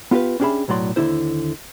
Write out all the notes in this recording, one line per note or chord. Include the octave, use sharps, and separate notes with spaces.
B3 F4 G4 A#4 B4
C#4 D4 G4 G#4 E5 B5
B1 A2 F#3 D5 C6
D#2 B2 D3 E4 C5